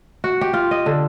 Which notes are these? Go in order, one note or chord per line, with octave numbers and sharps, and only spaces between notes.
F#4
G4
F4
D#5
D3